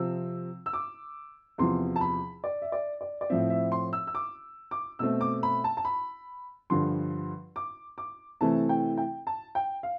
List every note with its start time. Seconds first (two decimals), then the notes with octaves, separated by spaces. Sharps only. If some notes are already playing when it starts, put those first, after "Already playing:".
Already playing: C3 F3 C4 E6
0.66 E6
0.73 D6
1.58 E2 C3 F3 C6
1.96 A5
2.01 B5
2.44 D5
2.62 E5
2.72 D5
3.01 D5
3.21 D5
3.30 A2 F3 C4 E5
3.50 E5
3.72 C6
3.93 E6
4.07 E6
4.15 D6
4.71 D6
4.99 B2 A3 C4 E6
5.21 D6
5.43 B5
5.64 A5
5.77 A5
5.85 B5
6.70 G2 D3 F3 C6
7.56 D6
7.98 D6
8.41 C3 E3 A3 C4 A5
8.69 G5
8.97 G5
9.27 A5
9.55 G5
9.83 F5